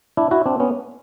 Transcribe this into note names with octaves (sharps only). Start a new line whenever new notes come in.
D4 E4
E4 F#4
C4 D4
B3 C#4